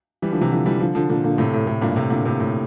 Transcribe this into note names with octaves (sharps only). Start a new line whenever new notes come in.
E3 G3
D3 F3
C3 E3
D3 F3
E3 G3
D3 F3
D3 F3
A#2 D3
A#2 D3
A2 C3
A2
A2
G2 A#2
A2 C3
A#2 D3
A2 C3
A2